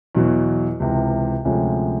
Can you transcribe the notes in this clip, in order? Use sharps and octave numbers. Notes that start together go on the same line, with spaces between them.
E2 B2 F#3
C#2 C3 E3
D2 C3 F3 G#3 C#4